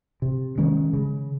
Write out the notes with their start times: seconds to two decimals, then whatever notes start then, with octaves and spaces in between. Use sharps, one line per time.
0.22 C3
0.58 D#3 G#3 C#4
0.93 C#3